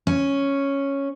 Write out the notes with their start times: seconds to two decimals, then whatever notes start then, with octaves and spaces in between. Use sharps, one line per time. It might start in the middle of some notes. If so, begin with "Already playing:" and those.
0.07 C#4